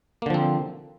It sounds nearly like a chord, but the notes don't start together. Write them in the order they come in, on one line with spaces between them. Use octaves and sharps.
A#3 D3 F3 C4